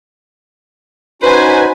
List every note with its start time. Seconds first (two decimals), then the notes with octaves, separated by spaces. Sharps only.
1.22 C#4 D#4 F#4 B4 C5 G#5